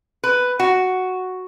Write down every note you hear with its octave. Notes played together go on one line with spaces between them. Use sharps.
B4
F#4